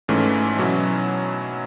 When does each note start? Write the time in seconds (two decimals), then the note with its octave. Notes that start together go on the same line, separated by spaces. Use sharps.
0.08 G#1 G#2 E3 A3 C#4
0.58 B2 F#3 C#4 E4